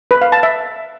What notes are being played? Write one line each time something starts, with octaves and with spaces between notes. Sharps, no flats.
B4
F5
A5
E5